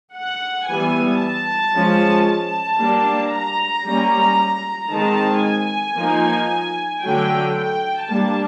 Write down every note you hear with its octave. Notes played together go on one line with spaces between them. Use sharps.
F#5
E3 G3 B3 G#5
A5
F3 G#3 C#4
A5
G3 A#3 D4
A#5
G3 A#3 C#4
D#3 G#3 C4 D#4 A5
G#5
F3 A#3 D#4
D3 F#3 A3 G5
G5
G3 A#3 D4 A5